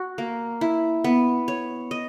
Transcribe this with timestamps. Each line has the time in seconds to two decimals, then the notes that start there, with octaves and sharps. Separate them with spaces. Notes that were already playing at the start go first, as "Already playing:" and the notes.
Already playing: F#4
0.18 A#3
0.61 E4
1.04 B3
1.48 C#5
1.91 D#5